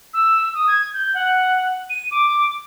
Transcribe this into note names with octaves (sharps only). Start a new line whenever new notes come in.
E6
D#6
G#6
G6
F#5
D#7
D6